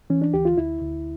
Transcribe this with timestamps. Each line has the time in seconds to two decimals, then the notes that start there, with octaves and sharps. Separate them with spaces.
0.10 E3 C#4
0.22 D4
0.34 D2 G4
0.45 F4
0.58 D2 E4
0.81 D2